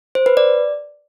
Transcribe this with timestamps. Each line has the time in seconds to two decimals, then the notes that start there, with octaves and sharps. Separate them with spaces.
0.15 C5
0.26 B4
0.37 D5